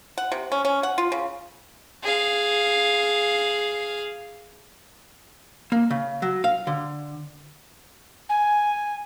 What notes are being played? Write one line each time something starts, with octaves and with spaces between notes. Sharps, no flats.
F#5
C3
C#4
C#4
F#5
F4
C#3
G#4 F5
A#3
C#3
F#3
F5
D3
G#5